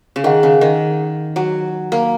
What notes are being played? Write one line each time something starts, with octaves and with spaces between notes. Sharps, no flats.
C#3
D#3 G#4 F#5
C#3
D#3
F#3
A#3